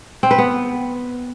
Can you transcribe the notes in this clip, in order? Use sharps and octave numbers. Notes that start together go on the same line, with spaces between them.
C4
B4
B3